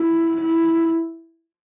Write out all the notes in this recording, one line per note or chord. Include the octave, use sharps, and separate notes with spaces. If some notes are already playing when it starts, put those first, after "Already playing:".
Already playing: E4
E4